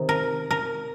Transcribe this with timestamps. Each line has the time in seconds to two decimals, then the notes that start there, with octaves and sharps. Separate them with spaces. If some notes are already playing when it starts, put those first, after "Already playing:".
Already playing: C3 D#3
0.09 A#4
0.51 A#4